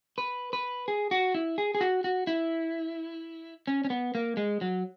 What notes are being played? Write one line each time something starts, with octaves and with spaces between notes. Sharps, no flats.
B4
B4
G#4
F#4
E4
G#4
G#4
F#4
F#4
E4
C#4
C#4
B3
A#3
G#3
F#3